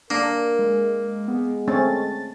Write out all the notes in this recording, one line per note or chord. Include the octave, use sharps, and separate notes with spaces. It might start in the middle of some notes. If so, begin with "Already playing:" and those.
A#3 D4 A#4
G#3
G#3 B3
A3 C4 C#4 A6